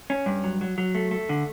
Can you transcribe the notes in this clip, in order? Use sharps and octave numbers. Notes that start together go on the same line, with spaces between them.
C#4
G2
F#3
F#3
F#3
A3
A3
D3